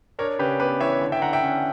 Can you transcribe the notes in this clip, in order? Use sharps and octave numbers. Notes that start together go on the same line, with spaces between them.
D4 A#4 C#5
C#3 G4 B4
B3 G4 B4
E3 C#5 E5
D3
E5 G5
D3 F#5 A#5
E5 G5
C#4